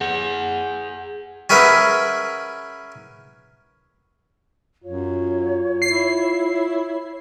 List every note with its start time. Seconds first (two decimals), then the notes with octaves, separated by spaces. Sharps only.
0.01 G#4 F#5
1.50 C#4 G#4 A#4 B4 E5 F#5
4.84 F#2 F4 C#5
5.82 E4 C7